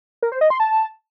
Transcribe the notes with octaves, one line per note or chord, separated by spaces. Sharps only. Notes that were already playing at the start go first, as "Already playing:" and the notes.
A#4
C5
D#5
C6
A5